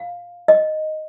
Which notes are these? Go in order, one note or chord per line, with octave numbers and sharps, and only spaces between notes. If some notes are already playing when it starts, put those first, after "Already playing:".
Already playing: F5
D#5